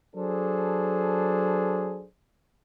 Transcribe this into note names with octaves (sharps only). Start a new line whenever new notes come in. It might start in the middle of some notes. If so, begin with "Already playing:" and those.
F#3 D4 G#4 A4 C5